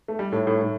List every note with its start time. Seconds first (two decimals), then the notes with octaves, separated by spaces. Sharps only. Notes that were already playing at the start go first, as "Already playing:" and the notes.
0.08 A3
0.19 G3
0.32 A2
0.47 A2
0.62 A2